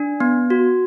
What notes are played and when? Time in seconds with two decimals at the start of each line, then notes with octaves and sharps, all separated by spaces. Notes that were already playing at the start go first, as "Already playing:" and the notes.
Already playing: D4
0.20 B3
0.50 F#4